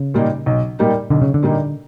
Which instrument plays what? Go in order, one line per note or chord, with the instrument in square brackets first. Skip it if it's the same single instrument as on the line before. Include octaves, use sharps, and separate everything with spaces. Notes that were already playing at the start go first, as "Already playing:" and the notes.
Already playing: [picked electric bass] C#3
[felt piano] A#2 G3 A#3 D#4
B1
A#2 G3 A#3 D#4
[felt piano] B1 [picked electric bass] D3
[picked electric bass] C#3
D3
[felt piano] A#2 G3 A#3 D#4